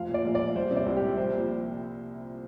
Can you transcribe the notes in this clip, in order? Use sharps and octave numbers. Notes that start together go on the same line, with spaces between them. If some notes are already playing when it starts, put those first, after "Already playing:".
Already playing: F1 F3 F5
A#2
D5
A#1
A#1 D5
G3 C5
C3
D5
C2
G4
C2
F3 C5
A#2